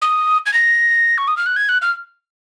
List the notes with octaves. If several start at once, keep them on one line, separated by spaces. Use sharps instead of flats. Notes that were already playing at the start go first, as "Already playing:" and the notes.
D#6
G#6
A#6
C#6
D#6
F6
F#6
G#6
F#6
F6